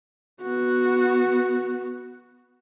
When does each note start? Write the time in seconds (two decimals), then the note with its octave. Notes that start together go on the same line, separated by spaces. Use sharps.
0.42 B3 F#4